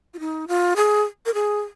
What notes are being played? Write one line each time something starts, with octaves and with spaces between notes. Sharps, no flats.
F4
D#4
F4
G#4
A#4
G#4